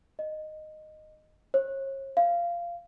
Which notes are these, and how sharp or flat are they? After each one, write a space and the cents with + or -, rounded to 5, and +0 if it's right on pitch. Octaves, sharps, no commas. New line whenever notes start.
D#5 -10
C#5 -40
F5 -15